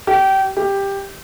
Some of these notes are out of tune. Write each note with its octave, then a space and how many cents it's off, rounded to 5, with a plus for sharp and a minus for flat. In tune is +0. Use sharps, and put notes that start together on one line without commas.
G4 -25
G4 +10